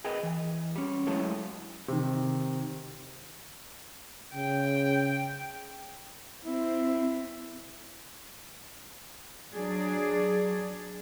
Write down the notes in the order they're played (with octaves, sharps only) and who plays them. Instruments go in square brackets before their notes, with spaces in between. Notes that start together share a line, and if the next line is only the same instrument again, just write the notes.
[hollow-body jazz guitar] G#4 A#4 B4 D#5 G5
E3
G3 C#4
F#3 G#3 A3 E4 A4 C#5
[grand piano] C3 D#3
[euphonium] C#3 [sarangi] G5
[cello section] C4 [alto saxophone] E4
[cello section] F#3 D4 G#4 D5